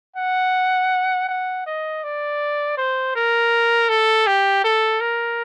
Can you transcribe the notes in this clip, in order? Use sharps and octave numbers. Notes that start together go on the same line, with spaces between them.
F#5
F#5
D#5
D5
C5
A#4
A4
G4
A4
A#4